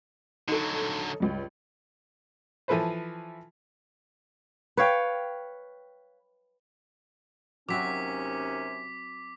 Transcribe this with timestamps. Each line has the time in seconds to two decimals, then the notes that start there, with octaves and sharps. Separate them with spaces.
0.48 D3 F#3 D#4 A4
1.20 C#2 G2
2.68 E3 F3 A4 B4 C5
4.77 B4 C#5 F5 G5
7.69 D#2 C3 F#3 C4 C#4 F#4 D6 B6